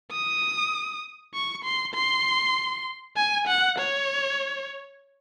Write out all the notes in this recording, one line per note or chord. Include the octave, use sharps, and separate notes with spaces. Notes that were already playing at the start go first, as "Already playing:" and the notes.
D#6
C#6
C6
C6
G#5
F#5
C#5